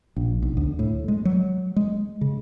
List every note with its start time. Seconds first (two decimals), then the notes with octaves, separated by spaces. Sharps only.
0.16 A#1
0.42 B1
0.57 D2
0.79 A2
1.08 G#3
1.25 F#3
1.76 G#3
2.21 C#3